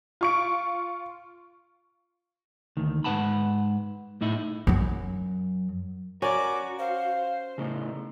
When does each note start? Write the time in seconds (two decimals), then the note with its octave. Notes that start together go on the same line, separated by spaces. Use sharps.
0.21 F4 C#6 D7
2.77 D2 D#3
3.04 G#2 G#3 B4 F#5 A5 B5
4.21 A2 D#4 E4
4.67 F#2 F#3
6.22 C#4 F#4 A#4 D5 D6
6.79 C5 F5
7.58 A2 C#3 D#4